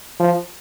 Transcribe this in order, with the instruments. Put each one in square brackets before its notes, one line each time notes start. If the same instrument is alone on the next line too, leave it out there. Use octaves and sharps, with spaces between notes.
[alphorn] F3